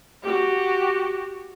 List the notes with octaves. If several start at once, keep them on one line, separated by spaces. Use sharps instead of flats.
F#4 G4